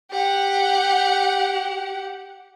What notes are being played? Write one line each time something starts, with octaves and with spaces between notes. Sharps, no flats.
G4 F#5